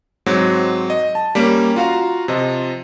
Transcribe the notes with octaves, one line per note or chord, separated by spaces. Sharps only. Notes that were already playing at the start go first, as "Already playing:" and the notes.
G#2 F#3 C4
D#5
A5
G3 A#3 C#4
F4 F#4 F5 A#5
C3 F3 D#5